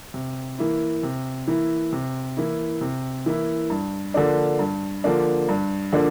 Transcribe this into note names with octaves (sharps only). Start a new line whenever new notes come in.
C3
E3 A#3 E4
C3
E3 A#3 E4
C3
E3 A#3 E4
C3
E3 A#3 E4
G2
D3 F3 A#3 D4
G2
D3 F3 A#3 D4
G2
D3 F3 A#3 D4